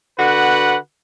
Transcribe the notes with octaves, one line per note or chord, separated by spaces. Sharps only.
D3 F#4 B4 F#5